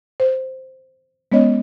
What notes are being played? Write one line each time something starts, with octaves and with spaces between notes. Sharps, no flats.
C5
G#3 B3 C#4 C#5 D#5